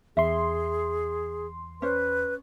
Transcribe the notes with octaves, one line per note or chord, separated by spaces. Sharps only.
E2 G#4 E5 C6
C#4 B4 C5